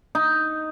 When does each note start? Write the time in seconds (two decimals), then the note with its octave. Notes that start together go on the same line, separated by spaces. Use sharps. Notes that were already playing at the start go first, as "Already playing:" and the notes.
0.15 D#4